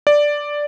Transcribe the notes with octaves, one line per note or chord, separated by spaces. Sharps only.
D5